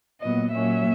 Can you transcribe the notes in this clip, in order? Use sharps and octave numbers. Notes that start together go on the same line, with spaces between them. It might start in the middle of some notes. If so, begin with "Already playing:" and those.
A#2 F#3 B3 D#5
A#2 F#3 A#3 C#4 E5